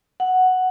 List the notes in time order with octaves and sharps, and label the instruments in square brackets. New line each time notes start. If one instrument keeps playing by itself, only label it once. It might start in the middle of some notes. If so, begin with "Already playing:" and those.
[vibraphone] F#5